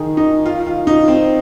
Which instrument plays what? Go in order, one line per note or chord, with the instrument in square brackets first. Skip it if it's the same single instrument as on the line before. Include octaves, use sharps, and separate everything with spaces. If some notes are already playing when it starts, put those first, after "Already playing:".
Already playing: [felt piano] D#3 [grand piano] G#4
[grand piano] D#4
F4
F4
D#4
C4